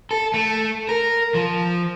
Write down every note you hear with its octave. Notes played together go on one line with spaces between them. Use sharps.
A4
A3
A#4
F3